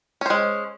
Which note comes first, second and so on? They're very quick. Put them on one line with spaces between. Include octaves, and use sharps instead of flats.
C#4 C5 G#3